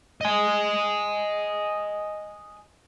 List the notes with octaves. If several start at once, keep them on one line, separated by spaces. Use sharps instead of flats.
D#5 G#5